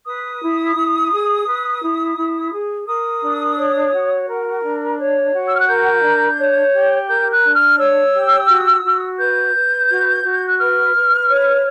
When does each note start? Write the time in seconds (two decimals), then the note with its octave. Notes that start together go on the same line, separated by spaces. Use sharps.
0.05 B4 D#6
0.41 E4
0.75 E4
1.11 G#4
1.46 B4
1.81 E4
2.17 E4
2.51 G#4
2.86 A#4 D#6
3.22 D4
3.57 C#5
3.92 F#4
4.27 A#4
4.62 D4
4.97 C#5
5.32 F#4
5.46 E6
5.53 F6
5.60 F#6
5.67 A#4 G6
6.03 D4
6.37 C#5
6.72 G4
7.07 A#4 G6
7.30 F#6
7.43 D4
7.54 F6
7.78 C#5 E6
8.12 G4
8.48 F#4
8.83 F#4
9.18 B4 G6
9.53 B4
9.88 F#4
10.23 F#4
10.46 F#6
10.58 B4 F6
10.93 B4
11.28 C#5